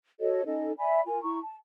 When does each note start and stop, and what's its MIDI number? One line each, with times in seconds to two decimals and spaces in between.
0.20 0.45 66
0.20 0.45 69
0.20 0.45 73
0.20 0.45 75
0.45 0.72 61
0.45 0.72 63
0.45 0.72 69
0.45 0.72 75
0.78 1.00 74
0.78 1.00 76
0.78 1.00 80
0.78 1.00 83
1.06 1.20 65
1.06 1.20 70
1.06 1.20 80
1.22 1.39 64
1.22 1.39 82
1.22 1.39 85
1.42 1.55 81